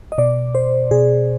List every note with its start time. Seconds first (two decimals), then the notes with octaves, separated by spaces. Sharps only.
0.12 D#5
0.18 B2 D5
0.55 C5
0.91 B2 G#4